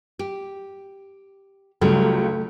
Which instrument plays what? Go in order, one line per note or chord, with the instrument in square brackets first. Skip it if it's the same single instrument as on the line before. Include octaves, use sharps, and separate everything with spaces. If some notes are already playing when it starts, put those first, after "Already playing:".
[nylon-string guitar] G4
[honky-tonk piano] C#2 [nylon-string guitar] C#3 F#3 G3 [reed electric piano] A3 A4